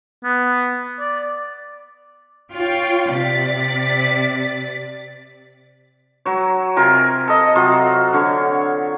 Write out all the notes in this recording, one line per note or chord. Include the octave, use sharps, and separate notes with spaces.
B3
D5
F4 C#5 G5
C3 D5 A6 B6
F#3 C#5
C3 F4 A#4 G#5
A4 D#5
C3 F#3 F4
D3 C#5